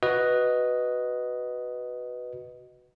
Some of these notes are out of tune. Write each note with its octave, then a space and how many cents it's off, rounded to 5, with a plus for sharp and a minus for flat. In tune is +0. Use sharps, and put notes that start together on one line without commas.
F#4 +0 B4 +0 D#5 +0